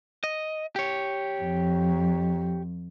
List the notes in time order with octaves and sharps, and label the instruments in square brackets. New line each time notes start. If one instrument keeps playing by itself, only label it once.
[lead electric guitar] D#5
G4 C#5
[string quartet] F2